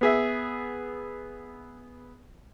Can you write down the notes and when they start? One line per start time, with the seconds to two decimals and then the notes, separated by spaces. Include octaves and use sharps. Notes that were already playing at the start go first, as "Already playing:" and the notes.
0.01 B3 G#4 E5